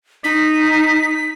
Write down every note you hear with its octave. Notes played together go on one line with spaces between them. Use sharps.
D#4 B6